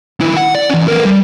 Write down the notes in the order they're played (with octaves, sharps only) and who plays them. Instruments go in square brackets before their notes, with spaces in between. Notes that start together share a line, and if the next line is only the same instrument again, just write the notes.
[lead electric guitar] D#3 E4
F#5
D5
E3 C#4
B3 A#4
G3